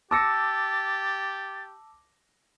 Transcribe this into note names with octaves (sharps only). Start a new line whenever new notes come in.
G4 A5 D6 E6 A6 A#6 C#7